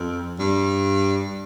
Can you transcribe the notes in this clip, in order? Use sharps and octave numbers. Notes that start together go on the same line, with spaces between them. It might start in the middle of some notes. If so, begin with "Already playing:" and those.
Already playing: F2
G2